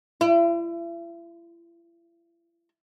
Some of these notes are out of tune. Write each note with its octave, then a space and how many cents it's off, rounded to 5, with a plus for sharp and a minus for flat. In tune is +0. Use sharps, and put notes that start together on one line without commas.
E4 +40